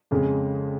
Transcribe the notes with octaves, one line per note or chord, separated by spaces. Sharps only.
F2 C#3 G#3